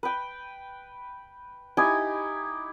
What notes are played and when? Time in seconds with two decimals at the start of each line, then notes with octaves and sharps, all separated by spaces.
0.03 B4 G5
1.77 D#4 E4 G4 G#5